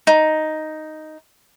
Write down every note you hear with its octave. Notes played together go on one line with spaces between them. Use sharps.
D#4